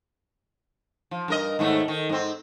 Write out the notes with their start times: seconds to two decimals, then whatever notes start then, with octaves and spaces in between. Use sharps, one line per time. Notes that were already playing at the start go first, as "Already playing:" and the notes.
1.11 F3
1.28 G2 A#4 D#5
1.59 D#2 G#2 A3
1.88 D#3
2.09 G#2 C4